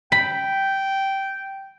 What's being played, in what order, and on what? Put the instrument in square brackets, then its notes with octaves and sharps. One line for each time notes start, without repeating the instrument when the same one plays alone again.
[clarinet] G5 [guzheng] B5